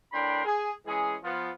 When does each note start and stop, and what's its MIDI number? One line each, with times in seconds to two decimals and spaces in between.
0.13 0.45 45
0.13 0.45 62
0.13 0.45 70
0.13 0.45 79
0.13 0.45 83
0.13 0.45 84
0.45 0.71 68
0.45 0.71 80
0.87 1.16 52
0.87 1.16 56
0.87 1.16 61
0.87 1.16 68
1.23 1.50 53
1.23 1.50 59
1.23 1.50 65